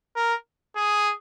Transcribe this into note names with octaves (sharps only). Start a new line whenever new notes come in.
A#4
G#4